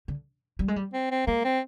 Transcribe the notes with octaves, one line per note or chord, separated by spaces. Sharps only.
D3
G3
G#3
G3
C4
C4
G#3 A#3
C4